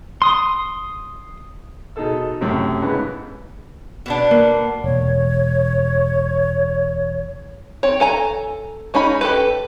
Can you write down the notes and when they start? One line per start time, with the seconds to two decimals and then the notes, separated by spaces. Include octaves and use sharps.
0.22 C6 D#6
1.96 B2 D#4 G#4 A4 E6
2.41 F#2 A2 C3
2.82 G#2 C#3 B3 E4
4.06 B2 B3 D4
4.31 A#3
4.84 E1 C#5
7.83 C4 C#5
8.00 A4 G#5 A#5
8.94 G#3 C#4 D#4 B5
9.21 G4 A4 B4